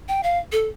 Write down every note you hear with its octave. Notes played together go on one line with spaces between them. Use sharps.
G5
F5
A4